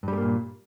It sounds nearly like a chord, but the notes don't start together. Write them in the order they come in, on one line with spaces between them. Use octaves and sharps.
G2 G3 A3 A#3 A#2